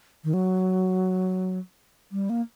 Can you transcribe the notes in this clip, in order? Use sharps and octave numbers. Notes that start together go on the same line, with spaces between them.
D#3
F#3
G3
A#3